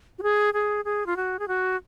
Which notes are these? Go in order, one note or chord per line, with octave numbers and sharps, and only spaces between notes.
F#4
G#4
G#4
G#4
F4
F#4
G#4
F#4